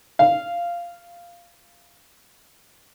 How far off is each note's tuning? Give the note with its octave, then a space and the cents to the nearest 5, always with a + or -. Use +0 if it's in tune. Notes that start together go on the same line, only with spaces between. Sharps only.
F5 -10